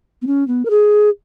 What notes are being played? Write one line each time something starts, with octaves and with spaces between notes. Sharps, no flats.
B3
C#4
B3
A#4
G#4